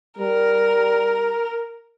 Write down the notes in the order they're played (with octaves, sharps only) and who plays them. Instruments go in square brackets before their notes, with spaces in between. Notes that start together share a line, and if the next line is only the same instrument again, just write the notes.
[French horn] G3 [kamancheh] A#4